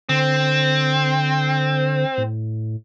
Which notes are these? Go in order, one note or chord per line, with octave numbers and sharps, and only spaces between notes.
D3 C4
A2